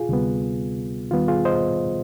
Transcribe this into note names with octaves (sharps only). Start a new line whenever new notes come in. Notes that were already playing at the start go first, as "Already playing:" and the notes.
Already playing: F4 G#4
D2 C3 G3 B3
D#2 D#3 G3 B3 F4
F4 G#4
C5 D#5